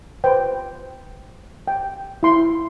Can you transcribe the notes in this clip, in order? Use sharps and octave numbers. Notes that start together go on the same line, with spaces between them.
B4 C5 G5
G5
E4 C6